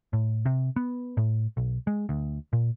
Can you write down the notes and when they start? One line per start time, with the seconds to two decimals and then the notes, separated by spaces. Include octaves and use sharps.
0.13 A2
0.46 C3
0.76 B3
1.17 A2
1.57 B1
1.87 G#3
2.09 D2
2.53 A#2